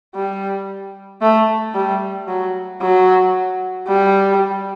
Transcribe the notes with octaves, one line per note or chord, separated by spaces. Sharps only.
G3
A3
G3
F#3
F#3
G3